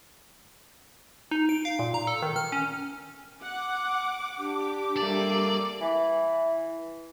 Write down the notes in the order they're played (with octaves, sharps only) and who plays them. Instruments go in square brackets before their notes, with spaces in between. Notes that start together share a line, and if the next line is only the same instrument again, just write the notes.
[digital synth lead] D#4
D7
F5
A#2
A#5
A4
D#3
F6
C#4
[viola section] F#5 [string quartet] D6
[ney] D4 [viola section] G4
[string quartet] G3 A3 A#3 [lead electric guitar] D5
[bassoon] E3